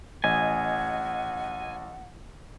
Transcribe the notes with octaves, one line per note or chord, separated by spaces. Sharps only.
A1 D#5 F#5 G#5